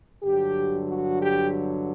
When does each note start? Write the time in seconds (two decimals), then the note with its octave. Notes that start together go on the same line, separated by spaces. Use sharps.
0.23 G2 D3 F#3 G4
0.88 F#4
1.21 G4